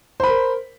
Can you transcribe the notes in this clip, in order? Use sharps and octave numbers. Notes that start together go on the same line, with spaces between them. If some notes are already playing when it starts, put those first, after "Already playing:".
A#4 C5 B5